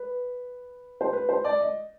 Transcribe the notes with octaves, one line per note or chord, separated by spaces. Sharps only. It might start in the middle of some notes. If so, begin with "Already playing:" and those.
Already playing: B4
C5
B4
C5
D5
D#5